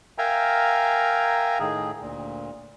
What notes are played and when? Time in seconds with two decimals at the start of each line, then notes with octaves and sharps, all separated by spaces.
0.18 A#4 E5 F5 G5 G#5 A#5
1.60 A2 D#3 G#4
2.01 D2 A#2